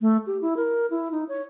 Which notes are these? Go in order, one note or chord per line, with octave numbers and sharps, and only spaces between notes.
A3
G4
E4
A#4
E4
D#4
C#5